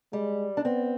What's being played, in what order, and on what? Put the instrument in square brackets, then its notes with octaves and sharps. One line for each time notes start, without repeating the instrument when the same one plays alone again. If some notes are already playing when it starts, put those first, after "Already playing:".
[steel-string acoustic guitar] G3 [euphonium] G#3
[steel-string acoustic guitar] D4
[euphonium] B3 [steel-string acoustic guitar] C4